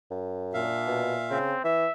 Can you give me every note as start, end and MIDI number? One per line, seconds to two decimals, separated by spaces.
0.11 0.68 42
0.54 1.38 46
0.54 1.02 62
0.54 1.38 76
0.54 1.38 77
0.87 1.15 47
1.30 1.55 49
1.30 1.63 60
1.64 1.87 52
1.64 1.92 76